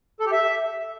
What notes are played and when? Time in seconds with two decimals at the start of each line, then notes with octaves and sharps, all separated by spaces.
0.20 A4
0.26 G4
0.32 E5